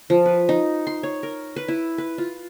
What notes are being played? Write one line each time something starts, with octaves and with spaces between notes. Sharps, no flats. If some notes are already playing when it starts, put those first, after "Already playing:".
F3
B4
D#4
C6
C#5
A#4
B4
E4
B4
F4